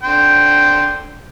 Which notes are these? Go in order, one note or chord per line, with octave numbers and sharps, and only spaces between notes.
D3 G5 C6